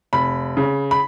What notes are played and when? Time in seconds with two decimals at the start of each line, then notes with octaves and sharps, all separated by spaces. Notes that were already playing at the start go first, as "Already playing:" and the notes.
0.13 F1 B5
0.57 C#3
0.91 B5